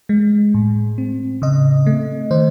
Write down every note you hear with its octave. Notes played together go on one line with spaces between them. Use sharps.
G#3
A2
C4
C#3 D#5
A3
D#3 C5